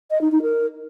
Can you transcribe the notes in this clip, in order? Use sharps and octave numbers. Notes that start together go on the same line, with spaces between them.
D#5
D#4
D#4
A#4